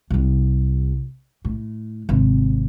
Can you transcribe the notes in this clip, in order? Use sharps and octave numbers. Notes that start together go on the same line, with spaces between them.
C2 C3
A2
G#1 C3